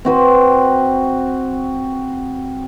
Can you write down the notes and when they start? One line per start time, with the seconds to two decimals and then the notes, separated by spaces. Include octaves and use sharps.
0.05 C4 F#4 B4